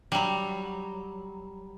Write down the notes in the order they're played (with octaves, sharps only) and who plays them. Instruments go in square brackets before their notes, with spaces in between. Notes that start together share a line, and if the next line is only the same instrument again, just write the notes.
[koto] F#3 G3